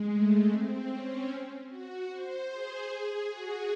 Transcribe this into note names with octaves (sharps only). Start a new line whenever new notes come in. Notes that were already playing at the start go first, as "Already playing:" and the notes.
Already playing: G#3
A3
C4
C#4
F#4
C5
G#4
F#4